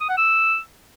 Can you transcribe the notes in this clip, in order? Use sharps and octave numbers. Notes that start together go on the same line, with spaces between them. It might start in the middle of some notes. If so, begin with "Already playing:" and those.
D#6
F#5
E6